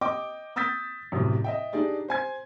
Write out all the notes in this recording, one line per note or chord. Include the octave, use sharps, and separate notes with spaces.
D#5 G5 D6
D#6 E6 G6 A6 B6
A1 F#2 C3
D#5 E5 G5
D4 D#4 G4 G#4 D5
C5 G#5 G#6